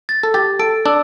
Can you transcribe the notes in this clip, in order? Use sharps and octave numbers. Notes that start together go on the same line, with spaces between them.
A6
A4
G4 A6
A4 D7
D4 E6